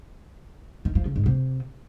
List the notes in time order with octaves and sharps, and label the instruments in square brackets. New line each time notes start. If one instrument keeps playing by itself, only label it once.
[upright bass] D#3
F3
C#3
G#2
C3